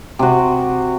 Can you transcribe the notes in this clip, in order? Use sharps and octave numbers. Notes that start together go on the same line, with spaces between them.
C3 F#4